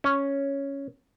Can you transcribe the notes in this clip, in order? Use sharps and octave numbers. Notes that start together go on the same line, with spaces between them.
C#4